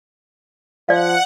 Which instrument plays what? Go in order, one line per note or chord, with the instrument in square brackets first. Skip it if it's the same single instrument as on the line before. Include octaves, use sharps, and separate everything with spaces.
[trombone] F3 [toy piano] D5 F5 [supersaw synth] F#5